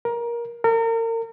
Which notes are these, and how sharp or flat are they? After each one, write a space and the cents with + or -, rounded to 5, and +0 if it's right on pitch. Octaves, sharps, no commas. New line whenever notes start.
A#4 +20
A#4 -35